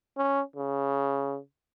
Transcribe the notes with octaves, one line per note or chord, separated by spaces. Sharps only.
C#4
C#3